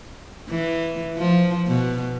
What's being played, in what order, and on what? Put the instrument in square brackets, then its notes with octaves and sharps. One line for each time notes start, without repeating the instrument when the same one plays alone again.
[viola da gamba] E3
F3
B2